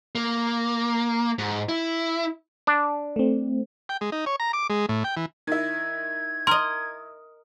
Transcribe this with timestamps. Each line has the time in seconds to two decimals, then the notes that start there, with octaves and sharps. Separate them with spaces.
0.15 A#3
1.39 G#2
1.69 E4
2.67 D4
3.16 A3 C4
3.89 G5
4.01 G#3
4.12 D#4
4.26 C#5
4.40 A#5
4.53 D6
4.70 G#3
4.89 A2
5.04 G5
5.17 E3
5.47 D#3 E4 G#6
6.47 A#4 D#5 C6